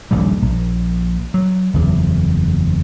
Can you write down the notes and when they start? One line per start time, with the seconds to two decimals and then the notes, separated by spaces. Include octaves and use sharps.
0.11 D#1 A#1 A#2 G3
0.42 A#1
1.34 F#3
1.74 F#1 E2